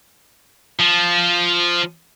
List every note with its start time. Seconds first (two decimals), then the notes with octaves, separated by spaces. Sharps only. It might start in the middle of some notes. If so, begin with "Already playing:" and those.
0.80 F3